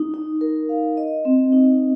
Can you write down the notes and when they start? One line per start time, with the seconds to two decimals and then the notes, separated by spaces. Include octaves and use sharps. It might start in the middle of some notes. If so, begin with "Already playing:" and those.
Already playing: D#4
0.14 D#4
0.41 A#4
0.69 F5
0.97 D#5
1.25 C4
1.52 D#4